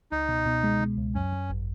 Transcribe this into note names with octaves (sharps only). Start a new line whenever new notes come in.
C#2 D#4
B2
B2
G#3
B2
C#2
F#2 C#4
F#2
G#1